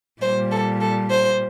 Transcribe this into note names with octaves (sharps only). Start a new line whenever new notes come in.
A#2 G3 C5
A4
A4
C5